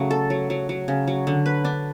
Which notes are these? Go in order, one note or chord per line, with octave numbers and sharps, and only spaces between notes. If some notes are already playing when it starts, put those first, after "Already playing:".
Already playing: C#3 F#3 A3
A4
F#3
F#3
F#3
C#3
F#3
D3
B4
D4